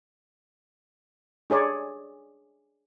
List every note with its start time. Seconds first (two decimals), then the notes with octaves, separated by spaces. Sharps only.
1.50 D4 G#4 C#5 D5